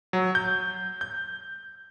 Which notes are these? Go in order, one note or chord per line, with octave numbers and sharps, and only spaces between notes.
F#3
G6
G6